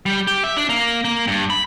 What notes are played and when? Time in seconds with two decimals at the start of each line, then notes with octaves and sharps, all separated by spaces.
0.06 G3
0.27 G4
0.44 E5
0.57 D4
0.69 A#3
1.05 A#3
1.27 G2
1.50 B5